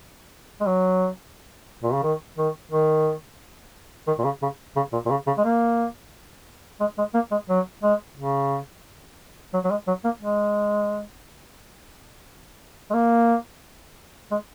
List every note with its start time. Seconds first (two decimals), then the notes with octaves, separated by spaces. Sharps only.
0.61 G#3
0.67 F#3
1.83 A#2
1.93 C#3
2.03 D#3
2.38 D#3
2.71 D#3
4.07 D#3
4.19 A#2
4.24 C#3
4.42 C#3
4.76 C#3
4.93 A#2
5.06 A#2
5.11 C#3
5.27 C#3
5.38 G#3
5.45 A#3
6.80 G#3
6.98 G#3
7.14 A#3
7.31 G#3
7.49 F#3
7.83 G#3
8.17 C#3
9.54 F#3
9.64 F#3
9.71 G#3
9.87 F#3
10.04 A#3
10.22 G#3
12.90 G#3
12.94 A#3
14.31 G#3